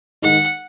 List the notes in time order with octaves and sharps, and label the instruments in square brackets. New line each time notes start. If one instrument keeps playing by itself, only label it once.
[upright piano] D#3 G#3 D#4 [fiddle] F#5